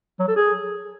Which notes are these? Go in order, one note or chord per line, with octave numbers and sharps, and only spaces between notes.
F#3
A4
G#4